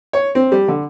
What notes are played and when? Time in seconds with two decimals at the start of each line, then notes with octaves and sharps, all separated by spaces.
0.13 C#5
0.35 C4
0.52 G3
0.68 D3